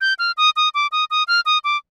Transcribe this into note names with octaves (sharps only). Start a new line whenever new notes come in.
G6
F6
D#6
D#6
D6
D#6
D#6
F6
D#6
D6